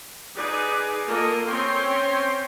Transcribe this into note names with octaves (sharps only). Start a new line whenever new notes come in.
D#4 G#4 B4 D5
A#3 F4 A4 A#4 D#5
C4 C#4 C#5 G5 C6